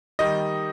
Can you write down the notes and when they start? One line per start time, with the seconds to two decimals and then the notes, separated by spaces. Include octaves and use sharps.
0.19 D#3 G3 D#5